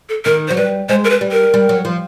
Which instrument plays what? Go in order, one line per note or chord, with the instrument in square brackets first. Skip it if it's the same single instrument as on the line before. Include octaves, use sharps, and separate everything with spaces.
[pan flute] A4
[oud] D#3 [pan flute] A#4
[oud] F#3 [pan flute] C5
[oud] G3 [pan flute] B4
[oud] G#3 [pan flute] C5
[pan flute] A#4
B4
[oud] G3
[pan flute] A#4
[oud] G3
F#3
F3